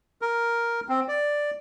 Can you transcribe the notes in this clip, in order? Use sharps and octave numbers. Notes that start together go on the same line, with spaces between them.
A#4
C4
D5